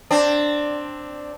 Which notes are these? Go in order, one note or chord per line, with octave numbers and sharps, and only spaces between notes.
C4 D4